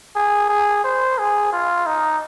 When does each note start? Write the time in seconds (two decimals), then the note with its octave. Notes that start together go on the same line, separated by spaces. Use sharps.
0.16 G#4
0.49 G#4
0.84 C5
1.18 G#4
1.53 F4
1.86 D#4